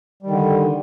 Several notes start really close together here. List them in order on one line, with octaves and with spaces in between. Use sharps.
G3 D#3 D3